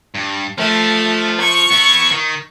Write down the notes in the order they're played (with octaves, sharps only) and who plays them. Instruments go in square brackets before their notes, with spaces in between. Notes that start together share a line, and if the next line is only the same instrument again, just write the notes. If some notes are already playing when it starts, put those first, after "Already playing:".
[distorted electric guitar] G2
[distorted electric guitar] F3 [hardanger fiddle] A3
[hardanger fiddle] C#6
[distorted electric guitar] B3 E4
D#3